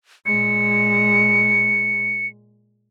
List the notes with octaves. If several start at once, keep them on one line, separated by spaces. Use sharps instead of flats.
A#2 G#3 C#7